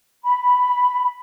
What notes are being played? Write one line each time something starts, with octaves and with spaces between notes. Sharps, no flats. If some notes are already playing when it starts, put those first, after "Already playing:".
B5